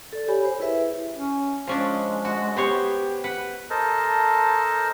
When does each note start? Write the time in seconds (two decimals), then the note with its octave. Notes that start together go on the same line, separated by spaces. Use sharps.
0.13 A4 D5
0.28 G4 C#5 G#5 B5
0.45 C5
0.60 E4 G#4 B4 E5
1.16 C#4
1.67 F3 G#3 C#4 D4
2.25 F#4
2.57 B3 G4 C5 C#5
3.24 B4 F#5
3.70 A4 A#4 C5 D#5 A5